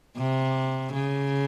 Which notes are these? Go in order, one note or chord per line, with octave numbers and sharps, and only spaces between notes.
C3
C#3